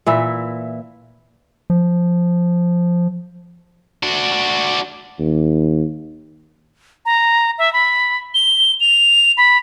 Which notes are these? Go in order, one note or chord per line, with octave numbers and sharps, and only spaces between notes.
A#2 E3 E4
F3
D4 F#4
D#2
A#5
E5
B5
G7
F7
B5